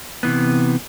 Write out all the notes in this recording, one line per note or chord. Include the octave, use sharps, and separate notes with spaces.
C3 E3 B3